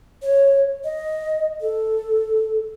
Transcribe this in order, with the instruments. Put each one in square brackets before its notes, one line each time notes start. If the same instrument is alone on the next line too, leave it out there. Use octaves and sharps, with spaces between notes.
[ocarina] C#5
D#5
A4